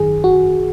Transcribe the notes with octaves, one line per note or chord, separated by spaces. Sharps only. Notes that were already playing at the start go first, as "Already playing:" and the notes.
Already playing: G#1 F#2 D#3 G#4
F#4